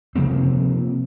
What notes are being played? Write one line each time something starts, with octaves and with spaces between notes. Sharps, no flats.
C3 F3 A#3 C4